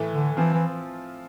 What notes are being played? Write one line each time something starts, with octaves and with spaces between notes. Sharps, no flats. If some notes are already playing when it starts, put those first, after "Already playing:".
Already playing: A2 E3 A3
D3
E3 F3 C4 F4
E3